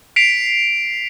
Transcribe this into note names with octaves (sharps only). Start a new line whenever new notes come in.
B6 C7 D7 F7